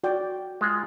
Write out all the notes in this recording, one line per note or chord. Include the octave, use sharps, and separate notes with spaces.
F#4 D5 G5
G#3 F4